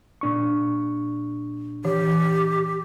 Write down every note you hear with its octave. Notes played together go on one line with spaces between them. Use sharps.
A#2 D4 C#6
E3 G4